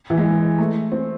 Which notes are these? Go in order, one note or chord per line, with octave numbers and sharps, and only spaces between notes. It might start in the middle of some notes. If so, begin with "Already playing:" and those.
E3
G#3
A3
C4